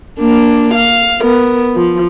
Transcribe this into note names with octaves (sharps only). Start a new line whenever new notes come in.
A#3 D4
F5
B3 A#4
F3